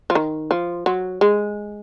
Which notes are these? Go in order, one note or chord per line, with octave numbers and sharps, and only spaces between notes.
F3
D#3
F3
F#3
G#3